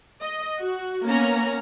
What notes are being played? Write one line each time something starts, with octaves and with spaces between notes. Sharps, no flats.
D#5
F#4
A#3 B3 C#4 A#5